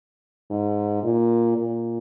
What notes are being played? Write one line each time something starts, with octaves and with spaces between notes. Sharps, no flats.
G#2
A#2
A#2